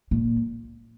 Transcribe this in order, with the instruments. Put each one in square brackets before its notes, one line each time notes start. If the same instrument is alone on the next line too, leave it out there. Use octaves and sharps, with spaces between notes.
[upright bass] A#2